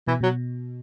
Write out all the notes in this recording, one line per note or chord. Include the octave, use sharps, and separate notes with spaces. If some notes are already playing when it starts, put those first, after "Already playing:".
B2 E3
B2 F#3